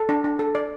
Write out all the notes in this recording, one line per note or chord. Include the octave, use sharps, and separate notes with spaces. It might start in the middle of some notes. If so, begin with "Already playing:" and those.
Already playing: A4
D4
D4
A4
D5